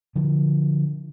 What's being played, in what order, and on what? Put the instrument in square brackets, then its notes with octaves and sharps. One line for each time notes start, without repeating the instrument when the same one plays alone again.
[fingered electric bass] D3 F3